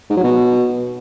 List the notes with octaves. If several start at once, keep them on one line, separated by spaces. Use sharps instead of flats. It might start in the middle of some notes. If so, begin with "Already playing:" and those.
G#2
F#3
B2